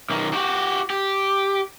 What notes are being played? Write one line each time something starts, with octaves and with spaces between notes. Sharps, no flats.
B1 D#3
F#4 G4
G4